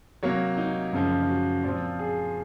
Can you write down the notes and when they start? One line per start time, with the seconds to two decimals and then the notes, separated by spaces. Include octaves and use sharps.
0.23 C3 F#3 A#3 C#5
0.58 D#4
0.93 F#2 C#3 F3 A#3
1.29 F#4
1.64 A#2 F3 C4 F4
1.99 G#4